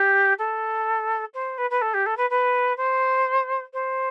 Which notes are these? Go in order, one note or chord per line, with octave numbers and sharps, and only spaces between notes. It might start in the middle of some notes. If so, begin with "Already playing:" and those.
Already playing: G4
A4
C5
B4
B4
A4
G4
A4
B4
B4
C5
C5